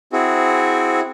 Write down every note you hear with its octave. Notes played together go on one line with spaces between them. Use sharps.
C4 E4 F#4 G#4